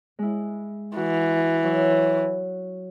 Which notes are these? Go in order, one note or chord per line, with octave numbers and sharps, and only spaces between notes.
G#3 E4
E3 F#4
F#3